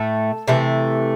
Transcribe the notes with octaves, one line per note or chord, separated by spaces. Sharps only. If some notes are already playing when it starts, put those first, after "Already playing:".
Already playing: A2 A3 A4
C3 E3 A3